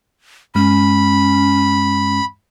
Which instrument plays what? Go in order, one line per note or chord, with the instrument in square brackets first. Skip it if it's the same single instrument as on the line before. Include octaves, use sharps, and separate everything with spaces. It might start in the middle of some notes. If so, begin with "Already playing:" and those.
[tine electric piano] G2 G#3 [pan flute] C#4 [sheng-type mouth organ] B5